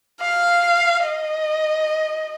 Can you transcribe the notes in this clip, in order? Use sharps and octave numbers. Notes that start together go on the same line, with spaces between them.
F5
D#5